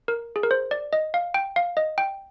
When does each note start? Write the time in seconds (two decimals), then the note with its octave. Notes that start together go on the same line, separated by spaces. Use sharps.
0.08 A#4
0.36 G#4
0.43 A#4
0.51 C5
0.71 D5
0.93 D#5
1.14 F5
1.34 G5
1.56 F5
1.77 D#5
1.98 G5